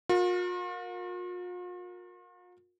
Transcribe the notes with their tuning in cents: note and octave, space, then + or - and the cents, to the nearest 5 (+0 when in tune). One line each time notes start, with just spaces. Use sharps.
F4 +45 A#4 +0